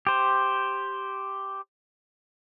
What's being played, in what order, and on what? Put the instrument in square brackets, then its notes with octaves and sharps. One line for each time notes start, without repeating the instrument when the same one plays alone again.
[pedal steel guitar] G4 C5